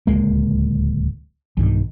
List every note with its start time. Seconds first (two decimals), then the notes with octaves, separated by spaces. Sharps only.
0.07 D1 C#2 G#3 A#3
1.57 B1 G2 D#3